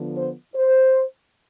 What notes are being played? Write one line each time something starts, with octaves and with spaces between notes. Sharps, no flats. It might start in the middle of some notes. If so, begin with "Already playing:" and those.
Already playing: D3 F3 B3
C5
C5